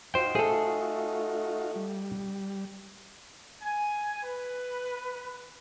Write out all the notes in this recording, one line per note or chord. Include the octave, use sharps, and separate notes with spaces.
D#4 F4 F#4 C5 G5
A3 G#4 A4
G3
G#5
B4